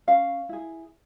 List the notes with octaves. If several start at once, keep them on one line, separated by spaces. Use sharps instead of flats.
C#4 F5
E4 G#4